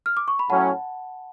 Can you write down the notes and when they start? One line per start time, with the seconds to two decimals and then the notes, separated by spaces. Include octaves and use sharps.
0.06 F6
0.17 D6
0.28 C#6
0.39 B5
0.50 A2 F#3 C#4 F#5 A5